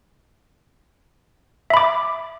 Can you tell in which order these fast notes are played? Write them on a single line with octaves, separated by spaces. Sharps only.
E5 B5 D6